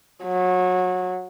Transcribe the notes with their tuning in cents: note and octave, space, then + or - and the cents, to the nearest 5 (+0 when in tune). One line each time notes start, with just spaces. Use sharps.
F#3 -25